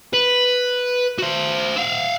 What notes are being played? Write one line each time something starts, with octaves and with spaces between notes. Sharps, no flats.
B4
F#4 C5
E5 F5